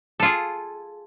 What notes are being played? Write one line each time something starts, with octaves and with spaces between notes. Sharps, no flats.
F4 G#4 A4